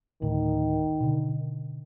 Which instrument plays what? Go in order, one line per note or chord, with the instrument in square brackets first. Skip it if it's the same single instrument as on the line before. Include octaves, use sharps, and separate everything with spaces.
[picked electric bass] A1 D2 A2 [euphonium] D#3
[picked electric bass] B2 D3